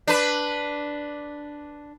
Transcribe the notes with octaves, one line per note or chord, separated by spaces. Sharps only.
D4 B4